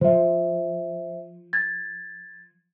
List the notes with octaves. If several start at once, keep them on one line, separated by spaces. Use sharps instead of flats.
F3 C5 E5
G#6 A6